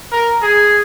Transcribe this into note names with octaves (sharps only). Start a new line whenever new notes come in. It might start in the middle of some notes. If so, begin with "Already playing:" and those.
A#4
G#4